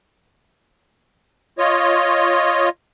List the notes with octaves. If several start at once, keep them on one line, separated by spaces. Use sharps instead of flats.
F4 C#5 D#5